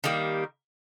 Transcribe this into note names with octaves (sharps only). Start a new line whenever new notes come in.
D#3 G3 A#3